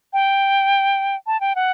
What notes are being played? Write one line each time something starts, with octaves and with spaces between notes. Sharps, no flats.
G5
A5
G5
F#5